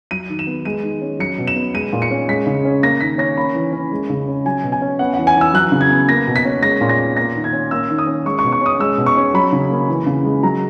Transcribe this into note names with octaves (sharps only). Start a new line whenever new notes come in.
F#3 D#7
D#3
E7
B3
G#3 D#7
D#3
C#4
F#3 C#7
B2
E7
B3
G#3 D#7
A#2
C#7
C#4
G#3 B6
C#3
C#4
A#3 A#6
D#3 B6
C#4 A#6
A#3 B5
E3
C#4
G#3
C#3
C#4
F#3 G#5
B2
G#5
C#4
B3 F#5
E3 F#5
G#5
E3 E6
F#3 F#6
C#3
G#6
B3
A#3 A#6
B2
B6
C#4
G#3 A#6
A#2
A#6
B3
A#3 A#6
D#3
G#6
C#4
A#3 E6
D#3
D#6
C#4
G#3 C#6
C#6
B2
C#6
C#4 D#6
G#3 E6
B2
C#6
C#4
F#3 B5
C#3
A#3
E3
C#3
G#3
F#3 A#5